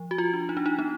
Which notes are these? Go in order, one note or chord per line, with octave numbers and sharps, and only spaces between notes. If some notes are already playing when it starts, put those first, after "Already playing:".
Already playing: F3
F#4
F4
D4
D#4
D4
D#4
B3 D#4